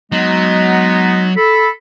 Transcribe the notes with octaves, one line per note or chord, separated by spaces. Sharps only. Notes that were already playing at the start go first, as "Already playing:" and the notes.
F#3 G#3 B3 D#4
A4 B5